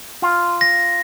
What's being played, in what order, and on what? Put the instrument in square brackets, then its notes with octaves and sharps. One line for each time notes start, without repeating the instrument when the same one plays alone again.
[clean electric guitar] F4
[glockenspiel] A#6